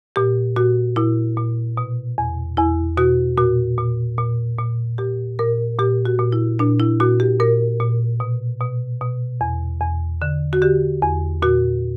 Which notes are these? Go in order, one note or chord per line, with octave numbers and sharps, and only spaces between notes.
A#2 G4
A#2 F#4
A#2 E4
A#2
B2
E2
E2 E4
B2 F#4
A#2 F#4
A#2
A#2
A#2
A#2 G4
A#2 A#4
A#2 G4
F#4
A#2
E4
A#2 D4
E4
A#2 F#4
G4
A#2 A#4
A#2
B2
B2
B2
E2
E2
D3
F#4
D3 G4
E2
A#2 F#4